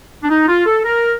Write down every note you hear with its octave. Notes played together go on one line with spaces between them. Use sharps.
D4
D#4
F4
A4
A#4